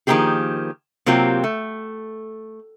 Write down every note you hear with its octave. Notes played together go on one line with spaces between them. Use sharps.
D#3 F3 A#3 C4 G4 G#4
C3 F#3 A#3 C4 F4 G4
A3